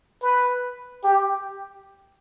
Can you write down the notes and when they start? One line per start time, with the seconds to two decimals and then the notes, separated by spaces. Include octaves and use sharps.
0.22 B4
1.04 G4